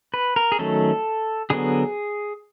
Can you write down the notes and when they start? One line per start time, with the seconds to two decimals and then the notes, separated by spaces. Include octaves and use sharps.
0.14 B4
0.36 A#4
0.52 G#4
0.59 D#3 F#3 A3 C#4 A4
1.50 D3 F#3 B3 G#4